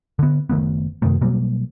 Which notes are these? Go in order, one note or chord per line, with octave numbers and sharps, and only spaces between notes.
D3 B3
F#1 D#3 A3 B3
F#2 C3 D#3 A3
B2 F#3 G3 A#3